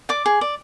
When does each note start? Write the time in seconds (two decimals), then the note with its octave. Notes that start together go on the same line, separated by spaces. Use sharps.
0.09 D5 D6
0.26 G#4
0.41 D5